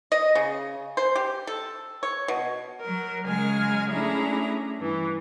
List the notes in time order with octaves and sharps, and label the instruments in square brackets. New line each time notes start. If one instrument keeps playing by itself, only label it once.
[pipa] D#5
C#3
C5
G4
A4
C#5
B2
[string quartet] F#3 A#4
C#3 F#3 G#3 G#5 A#5 F6
A3 C#4 D4 E4 G#4 A#5
G2 E3